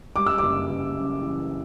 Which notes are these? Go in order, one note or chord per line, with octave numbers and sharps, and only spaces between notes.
G3 D6
E6
F#1 D6
F#1
F#2
E3